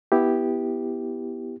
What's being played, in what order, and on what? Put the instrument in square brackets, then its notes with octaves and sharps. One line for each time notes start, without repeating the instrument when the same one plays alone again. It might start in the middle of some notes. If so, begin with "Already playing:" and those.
[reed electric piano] B3 E4 G4